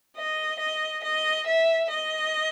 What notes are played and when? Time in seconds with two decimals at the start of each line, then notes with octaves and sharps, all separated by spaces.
0.17 D#5
0.59 D#5
1.04 D#5
1.47 E5
1.91 D#5